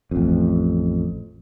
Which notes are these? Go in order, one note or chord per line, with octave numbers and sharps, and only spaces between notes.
A1 F2